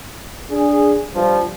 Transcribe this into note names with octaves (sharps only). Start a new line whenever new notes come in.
D4 G#4
G2 F3